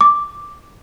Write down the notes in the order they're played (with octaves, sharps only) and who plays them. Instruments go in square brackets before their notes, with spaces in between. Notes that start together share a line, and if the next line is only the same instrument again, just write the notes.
[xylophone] D6